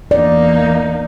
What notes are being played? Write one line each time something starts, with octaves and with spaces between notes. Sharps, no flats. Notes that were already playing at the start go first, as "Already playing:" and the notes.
E2 A#3 D#4 D5